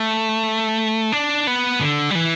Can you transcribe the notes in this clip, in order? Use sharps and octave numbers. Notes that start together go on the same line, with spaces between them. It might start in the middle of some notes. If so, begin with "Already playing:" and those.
Already playing: A3
D4
B3
D3
G3
E3